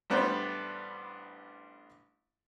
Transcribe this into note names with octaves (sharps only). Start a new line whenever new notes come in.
A1 G3 B3 D4 C5 B5